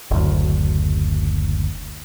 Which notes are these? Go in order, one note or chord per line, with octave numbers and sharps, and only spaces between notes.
F#1 D2